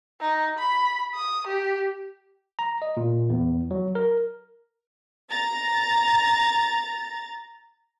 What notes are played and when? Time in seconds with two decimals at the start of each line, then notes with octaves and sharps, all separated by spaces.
0.21 D#4
0.59 B5
1.15 D#6
1.47 G4
2.59 A#5
2.82 D#5
2.97 A#2
3.30 E2
3.71 F#3
3.95 A#4
5.30 A#5 A6